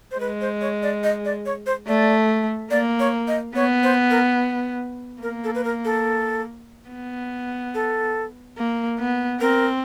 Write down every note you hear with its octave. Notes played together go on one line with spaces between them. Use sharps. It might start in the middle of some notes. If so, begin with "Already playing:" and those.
C5
G#3 B4
C5
C#5
D5
D#5
D5
C#5
C5
A3 D5
A#3 D5
C#5
D#5
B3 C#5
C5
A#4
A#3 A#4
A4
B4
A#4
A4
B3
A4
A#3
B3
C4 A#4